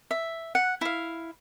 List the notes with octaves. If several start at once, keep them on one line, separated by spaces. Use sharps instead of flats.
E5
F#5
E4 F5